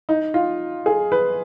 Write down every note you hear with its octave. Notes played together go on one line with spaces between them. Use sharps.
D#4
F4
G#4
B4